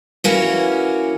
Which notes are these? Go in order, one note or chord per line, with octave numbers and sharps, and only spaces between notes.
E3 A#3 C#4 F#4